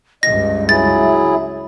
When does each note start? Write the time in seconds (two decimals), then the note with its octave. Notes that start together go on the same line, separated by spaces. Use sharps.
0.23 C#2 G2 D#5 A#6
0.69 F#3 E4 G#4 E5 A6